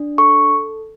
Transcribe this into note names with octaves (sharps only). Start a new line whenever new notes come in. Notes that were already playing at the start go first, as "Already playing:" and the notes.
Already playing: D4
A4 C#6